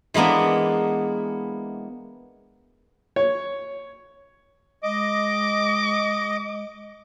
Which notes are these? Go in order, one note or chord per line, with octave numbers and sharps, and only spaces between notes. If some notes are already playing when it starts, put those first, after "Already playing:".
E3 G#3 A#3 B3 D4
C#5
G#3 D#5 D6